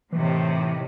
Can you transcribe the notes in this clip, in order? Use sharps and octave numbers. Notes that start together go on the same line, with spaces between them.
A2 C3 D#3 E3